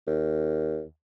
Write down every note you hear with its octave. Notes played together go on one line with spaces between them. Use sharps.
D#2